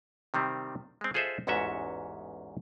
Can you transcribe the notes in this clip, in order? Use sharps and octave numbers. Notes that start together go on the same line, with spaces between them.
C3 D#3 G3 C4
G#3 C4
F4 G#4 A4 C5 D#5 E5
A1 E2 G#2 C#4 F#4 E5